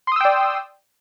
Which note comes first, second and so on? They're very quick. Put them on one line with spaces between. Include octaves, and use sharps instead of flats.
C6 D#6 E6 G5 D5